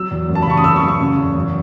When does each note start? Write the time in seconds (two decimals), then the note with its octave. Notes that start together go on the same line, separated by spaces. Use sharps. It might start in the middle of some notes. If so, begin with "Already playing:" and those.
Already playing: F#3 E6
0.11 E2
0.29 F#2
0.35 A5
0.42 B5
0.46 C#3 C#6
0.57 D#6
0.64 F#2 E6
0.76 C#6
0.82 F#2
0.88 C#6
1.00 C#3
1.18 E2
1.35 F#2